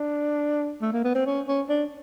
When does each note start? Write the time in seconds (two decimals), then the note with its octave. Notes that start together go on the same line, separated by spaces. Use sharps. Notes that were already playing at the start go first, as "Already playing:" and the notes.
Already playing: D4
0.82 A3
0.93 A#3
1.04 B3
1.15 C4
1.26 C#4
1.48 C#4
1.69 D4